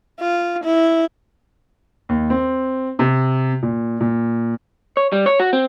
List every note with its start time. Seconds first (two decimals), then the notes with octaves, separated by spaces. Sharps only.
0.20 F4
0.65 E4
2.09 D#2
2.30 C4
2.99 C3
3.62 A#2
4.00 A#2
4.97 C#5
5.12 G3
5.26 C#5
5.40 F#4
5.53 C4